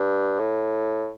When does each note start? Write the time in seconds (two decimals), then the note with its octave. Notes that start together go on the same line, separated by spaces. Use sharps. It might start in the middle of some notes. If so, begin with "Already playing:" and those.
Already playing: G2
0.39 A2